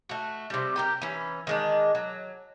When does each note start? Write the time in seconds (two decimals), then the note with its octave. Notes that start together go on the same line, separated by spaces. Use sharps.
0.09 A3 F#4
0.50 C3 G3
0.76 G4 A#4 G5
1.02 E3 C#4
1.47 D#3 G#3 D4
1.95 F#3